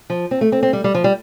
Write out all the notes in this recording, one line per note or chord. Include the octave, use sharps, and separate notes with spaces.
F3
C4
A3
C4
C4
G3
G3
F3
G3